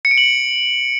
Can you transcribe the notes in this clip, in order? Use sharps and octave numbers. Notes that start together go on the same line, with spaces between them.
C#7
D7
F#7